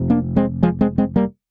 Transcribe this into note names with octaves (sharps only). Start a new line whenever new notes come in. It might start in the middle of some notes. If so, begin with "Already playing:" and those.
Already playing: F1 C3
A#3 D4
G#3 C4
F3 G#3
G#3 C4
G#3 C4
G3 A#3